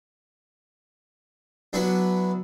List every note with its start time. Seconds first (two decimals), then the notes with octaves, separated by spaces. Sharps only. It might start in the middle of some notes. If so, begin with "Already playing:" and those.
1.73 F#3 B3 D4 E4 F#4 B4